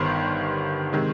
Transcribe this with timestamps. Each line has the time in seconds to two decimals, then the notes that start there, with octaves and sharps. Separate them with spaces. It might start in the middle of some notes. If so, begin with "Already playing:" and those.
Already playing: G1 G2 D#3 B3 C5 C6
0.93 C3 D#3 G#3 C4